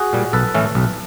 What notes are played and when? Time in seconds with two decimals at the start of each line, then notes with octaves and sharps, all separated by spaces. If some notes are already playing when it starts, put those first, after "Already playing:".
Already playing: F#4 G#4
0.13 A#2 G3
0.33 B1 A4 B4
0.54 A2 E3 A3 C#4
0.75 B1